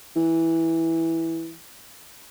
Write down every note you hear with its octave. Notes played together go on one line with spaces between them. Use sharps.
E3